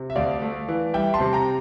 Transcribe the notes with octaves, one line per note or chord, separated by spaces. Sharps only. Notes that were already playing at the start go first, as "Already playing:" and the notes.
Already playing: C3
E5
D2 D5 F5
A3
E3
G3 E5 G5
A5 C6
C3
G5 A#5